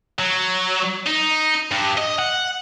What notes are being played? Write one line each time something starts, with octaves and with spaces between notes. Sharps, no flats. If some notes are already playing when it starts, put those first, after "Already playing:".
F#3
D#4
G2
D#5
F#5